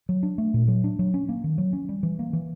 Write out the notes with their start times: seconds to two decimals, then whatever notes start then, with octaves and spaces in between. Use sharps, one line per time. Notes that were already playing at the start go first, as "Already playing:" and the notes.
0.09 F#3
0.23 D4
0.38 A3
0.54 A#2
0.68 F#3
0.84 D4
0.99 F#3
1.14 C#4
1.29 A#3
1.44 D#3
1.58 F#3
1.73 C#4
1.89 G3
2.03 E3
2.19 A#3
2.33 E3